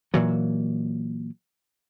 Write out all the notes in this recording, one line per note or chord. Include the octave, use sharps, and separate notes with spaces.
A#2 E3 F#3